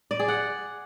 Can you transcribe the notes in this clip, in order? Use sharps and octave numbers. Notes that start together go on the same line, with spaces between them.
D5
G#4
F#5